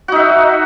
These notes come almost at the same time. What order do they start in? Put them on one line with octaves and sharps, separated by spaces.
F#4 D#4 E5